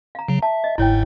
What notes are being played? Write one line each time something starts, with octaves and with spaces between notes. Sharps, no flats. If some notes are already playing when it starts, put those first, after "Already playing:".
F5 A#5
C#3 F#3
E5 A5
D#5
G1 G#2 E4 C#5 G5